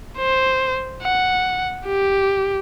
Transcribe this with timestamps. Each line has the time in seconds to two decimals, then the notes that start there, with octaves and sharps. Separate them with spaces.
0.18 C5
1.02 F#5
1.86 G4